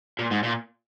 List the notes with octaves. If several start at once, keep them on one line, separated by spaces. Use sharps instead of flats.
A#2
G#2
A#2